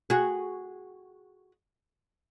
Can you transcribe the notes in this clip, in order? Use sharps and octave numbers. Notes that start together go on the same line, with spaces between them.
F#4 G#4